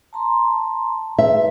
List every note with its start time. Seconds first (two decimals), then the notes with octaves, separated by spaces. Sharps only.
0.13 A5 A#5 C6
1.18 G#4 B4 E5